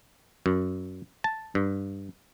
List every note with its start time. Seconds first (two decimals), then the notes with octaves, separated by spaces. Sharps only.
0.46 F#2
1.24 A5
1.55 G2